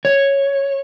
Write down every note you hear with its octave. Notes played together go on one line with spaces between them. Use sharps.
C#5